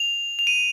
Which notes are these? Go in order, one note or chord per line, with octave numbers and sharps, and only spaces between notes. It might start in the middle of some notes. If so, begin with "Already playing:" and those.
Already playing: F7
F7
D#7